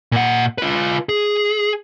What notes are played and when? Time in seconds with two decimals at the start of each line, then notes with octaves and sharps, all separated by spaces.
0.12 A#2 F#5
0.58 F4 B4
1.09 G#4